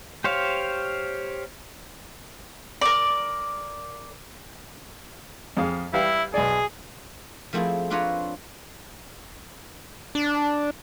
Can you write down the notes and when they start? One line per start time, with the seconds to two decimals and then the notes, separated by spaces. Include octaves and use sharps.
0.24 G4 C5 C#5 F5
2.81 A#4 D5
5.57 F2 G#4 F5
5.93 G3 E4 B4 F5
6.34 B1 G#4 D5
7.53 F3 A3 C4 E4 G#4
7.90 C4 D4 F4 B4 C#5 A#5
10.15 D4